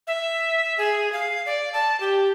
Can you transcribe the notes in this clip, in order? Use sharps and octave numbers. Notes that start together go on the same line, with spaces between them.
E5
G#4
F5
D5
A5
G4